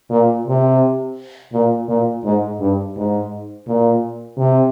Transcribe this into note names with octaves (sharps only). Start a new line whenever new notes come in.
A#2
C3
A#2
A#2
G#2
G2
G#2
A#2
C3